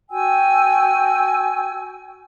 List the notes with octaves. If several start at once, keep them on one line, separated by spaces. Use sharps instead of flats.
F#4 G5 G#5 E6